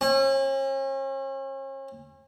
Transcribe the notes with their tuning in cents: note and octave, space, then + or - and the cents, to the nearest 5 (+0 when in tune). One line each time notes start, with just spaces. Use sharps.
C#4 -40